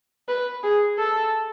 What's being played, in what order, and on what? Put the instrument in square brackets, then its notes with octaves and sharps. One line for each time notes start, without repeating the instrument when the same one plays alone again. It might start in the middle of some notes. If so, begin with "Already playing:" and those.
[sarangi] B4
G#4
A4